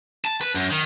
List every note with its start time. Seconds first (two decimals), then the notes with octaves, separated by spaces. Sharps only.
0.25 A5
0.41 B4
0.55 F#2
0.70 D#3